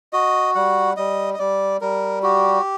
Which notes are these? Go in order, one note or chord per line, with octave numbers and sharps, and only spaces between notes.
F#4 D#5
G3 F#5
G3 D#5
D#5
G3 D5
G3 A#4
F#4 G4